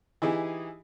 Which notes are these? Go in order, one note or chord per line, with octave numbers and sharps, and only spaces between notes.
E3 D#4 E4 G4 G#4